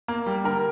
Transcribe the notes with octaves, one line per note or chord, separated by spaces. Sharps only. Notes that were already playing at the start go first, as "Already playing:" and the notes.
A#3
G3
D3 A#4